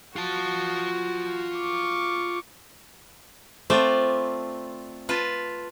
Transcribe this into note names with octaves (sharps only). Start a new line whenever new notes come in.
F4 F#4 A5
C#6 D6
A3 C4 F4 C5 D5
F4 B4 A5